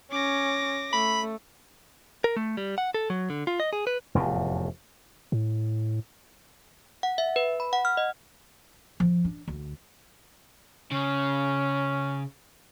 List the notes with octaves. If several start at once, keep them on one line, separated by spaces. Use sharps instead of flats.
C#4 D6 A#6
A3 B5
A#4
A3
G3
F#5
A4
F#3
D3
F4
D#5
G#4
B4
F1 E2 A2
A2
F#5
E5
B4
B5
F#5
F6
D#5
F3
D4
D2
C#3 C#4